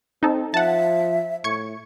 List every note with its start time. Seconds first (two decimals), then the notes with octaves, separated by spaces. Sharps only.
0.23 C4 D#4 A4
0.54 F3 E5 F#5 A5
1.44 A2 C#6 G#6 C#7